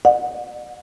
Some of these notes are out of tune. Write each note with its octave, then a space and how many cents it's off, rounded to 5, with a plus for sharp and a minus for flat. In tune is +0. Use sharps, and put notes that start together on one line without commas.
D5 +45 F#5 -30